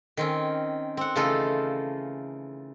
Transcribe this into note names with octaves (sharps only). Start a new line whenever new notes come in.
D#3 C4 C#4
C4 F#5
C#3 E3 A3 D#4 F4 A4